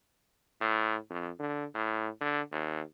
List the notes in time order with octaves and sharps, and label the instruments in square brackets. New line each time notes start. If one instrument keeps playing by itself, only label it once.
[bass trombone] A2
F2
D3
A2
D3
D#2